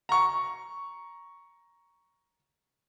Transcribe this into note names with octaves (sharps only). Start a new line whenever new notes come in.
A#5 C#6